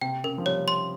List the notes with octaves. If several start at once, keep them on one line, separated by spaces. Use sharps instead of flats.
C3 G5
C#3 A#4
F3
G3 C#5
C6